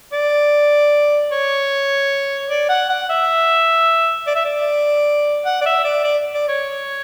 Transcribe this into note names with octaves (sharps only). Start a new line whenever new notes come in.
D5
C#5
D5
F#5
F#5
E5
D5
E5
D5
F#5
D5
E5
D5
D5
D5
C#5